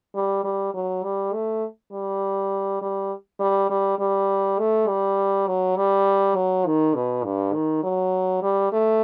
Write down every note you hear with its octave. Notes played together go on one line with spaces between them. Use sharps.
G3
G3
F#3
G3
A3
G3
G3
G3
G3
G3
A3
G3
F#3
G3
F#3
D#3
B2
G2
D#3
F#3
G3
A3